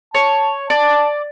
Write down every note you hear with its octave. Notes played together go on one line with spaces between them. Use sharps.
C#5 A5
D5 A5